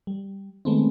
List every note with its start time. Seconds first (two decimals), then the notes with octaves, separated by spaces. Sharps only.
0.07 G3
0.65 D#3 G#3 A3 B3 C4